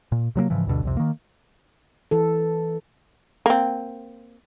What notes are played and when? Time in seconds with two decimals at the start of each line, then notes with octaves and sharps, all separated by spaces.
0.12 A#2
0.36 C3 F#3 G#3 A#3
0.50 G#2 C#3 E3 F3
0.67 D2 G2 B2 D3
0.83 C2 F2 C3
0.97 D#3 A#3
2.11 E3 A4
3.46 A#3 C4